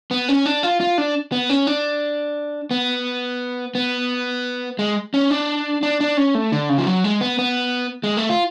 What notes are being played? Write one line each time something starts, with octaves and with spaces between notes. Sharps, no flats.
B3
C#4
D4
F4
F4
D4
B3
C#4
D4
B3
B3
G#3
C#4
D4
D4
D4
C#4
A3
D3
C#3
F3
F#3
G#3
B3
B3
G#3
A3
F4